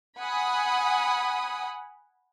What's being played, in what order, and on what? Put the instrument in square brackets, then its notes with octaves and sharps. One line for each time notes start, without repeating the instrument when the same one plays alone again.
[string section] F#5 G#5 B5 D#6